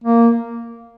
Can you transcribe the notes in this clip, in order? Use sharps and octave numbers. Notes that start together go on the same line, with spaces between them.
A#3